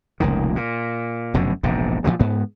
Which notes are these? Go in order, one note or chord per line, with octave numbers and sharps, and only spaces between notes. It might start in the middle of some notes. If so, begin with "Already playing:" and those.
F1 C#2 A#2 D#3
A#2
F1 F#2 B2 D3
E1 A#1 G#2 C3
A#2 C#3 F3 F#3
G#2 B3